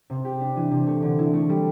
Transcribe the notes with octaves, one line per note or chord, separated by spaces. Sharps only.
C3
G4
D4
E3
C3
A3
D3
E4
A3
G3